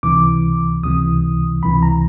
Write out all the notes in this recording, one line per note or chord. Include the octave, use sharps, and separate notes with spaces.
C#2 C3 E3 D6
C#2 C3 E3 D#6
C#2 C3 E3 B5
A#5